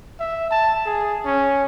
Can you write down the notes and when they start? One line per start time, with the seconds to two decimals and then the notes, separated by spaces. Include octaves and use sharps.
0.20 E5
0.51 A5
0.86 G#4
1.25 C#4